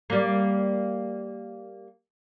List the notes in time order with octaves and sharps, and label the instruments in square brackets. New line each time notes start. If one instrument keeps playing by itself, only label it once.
[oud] G3 A#3